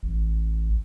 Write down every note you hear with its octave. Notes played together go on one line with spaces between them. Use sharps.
A1